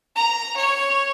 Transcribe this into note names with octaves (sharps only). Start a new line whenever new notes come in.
A#5
C#5